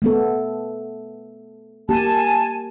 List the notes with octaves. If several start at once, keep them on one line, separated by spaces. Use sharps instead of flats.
A3 B3 A4
A#3 G4 G#5 A5